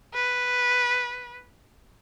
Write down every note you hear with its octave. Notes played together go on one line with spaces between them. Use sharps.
B4